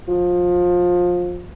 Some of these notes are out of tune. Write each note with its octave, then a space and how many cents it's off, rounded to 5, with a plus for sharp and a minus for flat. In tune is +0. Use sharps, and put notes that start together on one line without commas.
F3 +20